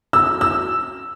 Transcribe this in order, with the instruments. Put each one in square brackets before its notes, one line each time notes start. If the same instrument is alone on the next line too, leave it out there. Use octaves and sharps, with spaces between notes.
[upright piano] E6
E6